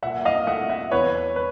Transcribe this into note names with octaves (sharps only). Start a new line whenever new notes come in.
A#2 E5 F#5
D#5 F5
A3 E5 F#5
E5 F#5
E2 B4 C#5
B4